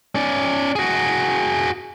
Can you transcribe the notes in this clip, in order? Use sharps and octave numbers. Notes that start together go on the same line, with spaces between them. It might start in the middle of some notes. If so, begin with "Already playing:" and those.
C#4 D5
F#4 G#4